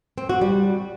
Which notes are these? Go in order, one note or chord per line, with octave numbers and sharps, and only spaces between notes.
C4
F#4
G3